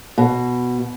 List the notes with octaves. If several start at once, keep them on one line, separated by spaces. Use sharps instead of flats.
B2